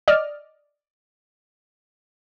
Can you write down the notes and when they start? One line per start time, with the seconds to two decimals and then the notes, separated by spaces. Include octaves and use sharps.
0.08 D5 D#5 F6